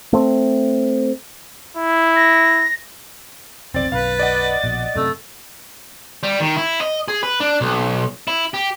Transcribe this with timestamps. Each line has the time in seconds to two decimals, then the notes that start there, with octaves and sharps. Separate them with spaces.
0.13 A3 C4
1.77 E4
2.16 A#6
3.74 F1 B1 C4 D5 A6
3.92 B1 F#2 B4 F5
4.19 D5 D#5 F#5
4.64 A#1 B2
4.96 F#2 C3 A3
6.23 G3
6.40 D#3
6.57 E4
6.81 D#5
7.08 G#4
7.23 B4
7.40 D4
7.61 B1
8.28 E4
8.54 G4